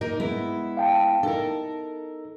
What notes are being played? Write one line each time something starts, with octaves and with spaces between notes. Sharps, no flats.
A#3 D#4 A#4
G#3 B3 E4
F5 G5 A5
D#4 A4 A#4